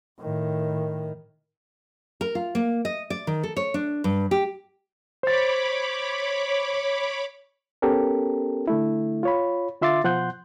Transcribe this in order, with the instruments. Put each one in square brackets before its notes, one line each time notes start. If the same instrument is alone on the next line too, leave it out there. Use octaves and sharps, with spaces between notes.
[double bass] A2 D#3
[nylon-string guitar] A#4
F4
A#3
D#5
D5
D#3
A4
C#5
D4
G2
G4
[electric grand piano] C5 A6 [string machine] C#5 B5 D6
[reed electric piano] B3 C#4 G4 A4 A#4
D3 A3 E4
F4 C#5 B5
D3 F4 E5 C6 D6 A6
B2 F3 F#5 C6 F#6 G6